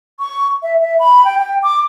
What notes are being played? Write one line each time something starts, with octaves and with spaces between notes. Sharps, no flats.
C#6
E5
E5
B5
G5
G5
D6